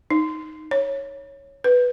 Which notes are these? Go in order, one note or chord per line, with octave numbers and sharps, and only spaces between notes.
D#4
C#5
B4